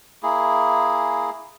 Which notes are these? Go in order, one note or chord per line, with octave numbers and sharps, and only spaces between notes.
A#3 E4 G#4